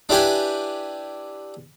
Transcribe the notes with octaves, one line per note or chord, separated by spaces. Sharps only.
D4 E4 G4 B4 G#5